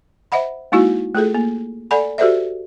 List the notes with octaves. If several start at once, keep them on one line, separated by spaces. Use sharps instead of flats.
C5 D#5 E5 F#5 B5
G#3 A#3 D#4 E4 F#4
A3 F4 G#4 A4
A#3
A4 D5 F#5 G#5 B5
F#4 G4 A4 C5 D5 E5